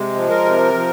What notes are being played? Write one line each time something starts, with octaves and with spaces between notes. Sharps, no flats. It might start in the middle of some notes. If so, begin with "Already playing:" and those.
Already playing: C3 G#3
F3
A#4
C3
F3